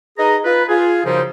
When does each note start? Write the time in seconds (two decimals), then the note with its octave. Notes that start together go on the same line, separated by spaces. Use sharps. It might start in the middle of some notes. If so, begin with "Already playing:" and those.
0.18 D#4 G#4 B4 D#5 A#5
0.44 F4 B4
0.69 F4 G#4
1.05 F#2 C#3 F3 G3 D#4 C5